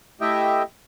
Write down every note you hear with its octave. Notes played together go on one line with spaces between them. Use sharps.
A3 E4 G4 D#5 E5 G5